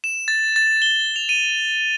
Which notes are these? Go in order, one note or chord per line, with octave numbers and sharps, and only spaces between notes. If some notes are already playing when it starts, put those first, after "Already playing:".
E7
A6
A6
G7
F7
D#7